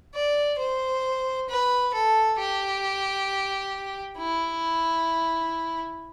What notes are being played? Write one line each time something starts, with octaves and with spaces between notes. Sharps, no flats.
D5
C5
B4
A4
G4
E4